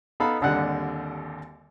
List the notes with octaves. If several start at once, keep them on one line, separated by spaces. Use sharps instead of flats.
B3 D#4 A4 F5 B5
G#1 D#2 D3 G3 F#5 F#6